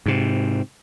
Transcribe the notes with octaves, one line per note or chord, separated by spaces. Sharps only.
G#2 C3